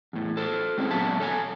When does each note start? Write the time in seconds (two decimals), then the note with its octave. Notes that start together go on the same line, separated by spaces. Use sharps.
0.13 E2 A2
0.37 A4 C5
0.78 G#3 C4 C#4 G#4
0.91 A#2 F#3 B3 E5 F5 A5
1.20 A4 C#5 G#5